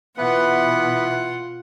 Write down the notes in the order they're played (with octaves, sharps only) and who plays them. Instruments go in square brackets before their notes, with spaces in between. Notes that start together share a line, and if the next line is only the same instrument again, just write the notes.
[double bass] B2 [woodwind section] E3 [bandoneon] B3 B4 [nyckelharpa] F4 F#5